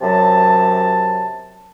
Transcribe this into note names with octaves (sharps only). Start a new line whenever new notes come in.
F#2 C3 F#3 A5